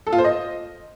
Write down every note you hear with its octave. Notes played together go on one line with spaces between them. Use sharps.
A4
F4
C5
D#5